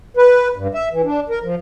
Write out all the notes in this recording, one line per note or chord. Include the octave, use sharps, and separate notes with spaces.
B4
G2
E5
E3
D4
A#4
F3